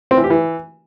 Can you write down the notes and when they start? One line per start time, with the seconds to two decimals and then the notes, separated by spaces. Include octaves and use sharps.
0.11 C4
0.17 E3
0.24 G4
0.30 E3